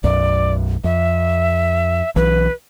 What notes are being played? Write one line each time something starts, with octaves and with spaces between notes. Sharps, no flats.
B1 F#2 D5
F2 E5
B1 E3 B4